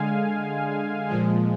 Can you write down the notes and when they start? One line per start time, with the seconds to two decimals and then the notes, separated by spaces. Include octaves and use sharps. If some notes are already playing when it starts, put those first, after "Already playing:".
Already playing: D3 G#3 F5 G#5
1.09 A#2 F3 G#3